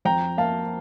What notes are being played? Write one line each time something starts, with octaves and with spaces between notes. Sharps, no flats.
F2 G5 A#5
A#3 F5 A5